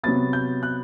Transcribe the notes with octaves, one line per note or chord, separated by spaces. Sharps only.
C3 F#3 B3 A6
G6
F#6